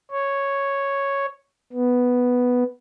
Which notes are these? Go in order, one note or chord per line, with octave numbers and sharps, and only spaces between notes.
C#5
B3